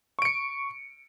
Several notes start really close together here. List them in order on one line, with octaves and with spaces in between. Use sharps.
C#6 D7 C#7